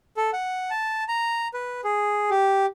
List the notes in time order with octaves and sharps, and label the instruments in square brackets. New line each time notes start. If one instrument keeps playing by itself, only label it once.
[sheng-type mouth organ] A4
F#5
A5
A#5
B4
G#4
G4